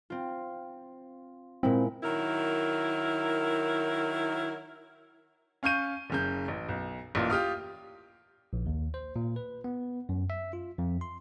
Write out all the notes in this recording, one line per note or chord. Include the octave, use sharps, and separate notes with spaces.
C4 F4
A#2 G#3 C4 E4
D#3 F#3 E4 A#4
C#4 F5 C#6 G6 D#7
F#1 C#3 G6
A1
B1
A1 A#2 F4
F4 G4 D#6 F6
A#1
D#2
C5
A#2
B4
B3
F#2
E5
F4
F2
C6